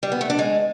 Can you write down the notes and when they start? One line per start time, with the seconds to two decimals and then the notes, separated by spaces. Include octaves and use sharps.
0.03 G3
0.12 B3
0.21 A3
0.30 D4
0.39 G#3